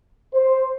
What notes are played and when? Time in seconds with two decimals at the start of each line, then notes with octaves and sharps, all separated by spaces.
0.34 C5